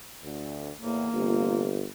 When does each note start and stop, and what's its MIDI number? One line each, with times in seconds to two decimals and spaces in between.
0.23 0.71 38
0.80 1.07 40
0.80 1.07 45
0.80 1.79 58
1.14 1.86 31
1.14 1.67 41
1.14 1.67 48
1.14 1.67 65